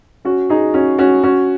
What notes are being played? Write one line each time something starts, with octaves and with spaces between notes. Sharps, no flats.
C#4 F#4
D#4 G#4
C#4 F#4
C#4 F#4
C#4 F#4